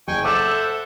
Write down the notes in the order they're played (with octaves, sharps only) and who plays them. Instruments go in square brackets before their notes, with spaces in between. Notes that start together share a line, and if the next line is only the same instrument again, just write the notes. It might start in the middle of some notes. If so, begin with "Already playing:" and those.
[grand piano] F#1 [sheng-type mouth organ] G5 G#5 C#6
[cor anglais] A4 [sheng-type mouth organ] C5 E5 F#5 [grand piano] D6 E7